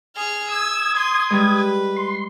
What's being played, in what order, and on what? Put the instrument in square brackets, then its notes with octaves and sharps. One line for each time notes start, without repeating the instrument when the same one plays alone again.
[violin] G#4 F6
[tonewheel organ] D#6 G#6 [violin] E6
[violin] C6
[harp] G3 G#3 [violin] B4
[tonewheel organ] C6